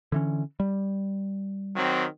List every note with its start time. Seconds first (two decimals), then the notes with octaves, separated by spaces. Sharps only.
0.12 D3 E3 C#4
0.60 G3
1.76 D#3 F#3 C4